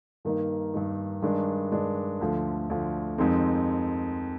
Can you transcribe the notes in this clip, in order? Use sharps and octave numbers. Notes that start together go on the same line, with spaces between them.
G2 D#3 A#3 D#4
G2 D#3 A#3 D#4
G2 D#3 G#3 D4
G2 D#3 G#3 D4
D2 D3 F3
D2 D3 F3
F2 D#3 G#3 C4 D#4